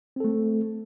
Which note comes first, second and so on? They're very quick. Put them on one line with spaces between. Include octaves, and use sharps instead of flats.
C4 A4 A3